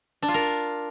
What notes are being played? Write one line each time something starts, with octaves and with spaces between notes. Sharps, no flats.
D4
F4
A#4